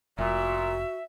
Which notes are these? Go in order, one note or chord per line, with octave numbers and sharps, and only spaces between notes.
F1 A#2 F#4 E5